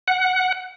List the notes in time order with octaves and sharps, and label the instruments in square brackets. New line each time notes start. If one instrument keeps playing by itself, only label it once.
[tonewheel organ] F#5